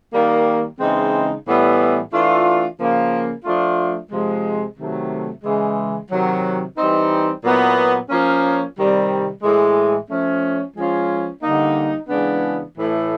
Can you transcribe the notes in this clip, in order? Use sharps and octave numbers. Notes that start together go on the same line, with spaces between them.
D#3 G3 A#3
C#3 E3 G#3 C4 D#4
A2 E3 G3 B3
E3 A3 D4 F4
C#3 F3 A#3
F3 A3 D4 F4
C3 F3 G#3
C3 D#3 F#3 A3
C#3 E3 G#3
C3 D#3 F#3
E3 G3 C4 D#4
A#2 F#3 B3 E4
F3 A#3 C#4
C3 D#3 G3 C4
A2 E3 G#3
F3 A3 C#4
F3 G#3 C#4 F4
D3 G3 A#3 D#4
C#3 E3 G#3 B3 D4
A2 E3 A3